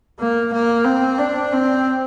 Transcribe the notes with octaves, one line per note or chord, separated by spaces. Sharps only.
A#3
A#3
C4
D4
C4